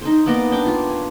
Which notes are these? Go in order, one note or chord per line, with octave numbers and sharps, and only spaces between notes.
D#4 C5
A#3 B3 D5 D#5
D4 G5 D6
F4
G#5